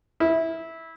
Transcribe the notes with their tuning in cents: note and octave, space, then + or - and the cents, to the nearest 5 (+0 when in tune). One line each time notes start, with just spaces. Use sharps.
E4 -15